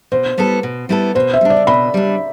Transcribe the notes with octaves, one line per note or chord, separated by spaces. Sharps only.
B2 C5
G3 B3 E4 A4
B2
G3 B3 E4 A4
B2 C5
E5
G3 D4
D5
B2 B5
G3 D4